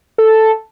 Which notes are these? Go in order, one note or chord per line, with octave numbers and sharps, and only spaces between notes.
A4